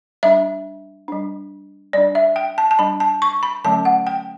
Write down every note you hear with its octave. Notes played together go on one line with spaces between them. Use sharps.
G3 D4 E5
G3 D4
G3 D4 D5
E5
G5
A5
A5
G3 D4 B5
A5
C#6
B5
D3 F#3 A3 C#4 A5
F#5
G5